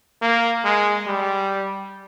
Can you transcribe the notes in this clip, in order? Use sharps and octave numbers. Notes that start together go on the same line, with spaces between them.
A#3
G#3
G3